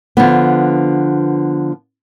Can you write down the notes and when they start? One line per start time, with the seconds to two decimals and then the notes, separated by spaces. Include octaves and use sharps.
0.17 D3 F3 B3